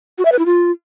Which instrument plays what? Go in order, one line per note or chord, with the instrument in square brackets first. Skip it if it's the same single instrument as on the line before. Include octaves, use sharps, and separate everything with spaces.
[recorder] F#4
E5
B4
E4
F4